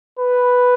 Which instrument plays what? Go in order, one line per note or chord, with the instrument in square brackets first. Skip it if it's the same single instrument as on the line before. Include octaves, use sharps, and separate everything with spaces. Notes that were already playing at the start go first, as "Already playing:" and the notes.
[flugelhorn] B4